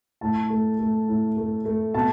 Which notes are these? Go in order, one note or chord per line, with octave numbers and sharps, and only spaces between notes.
A2 A5
A3
A3
A2
A3
A3
B2 A5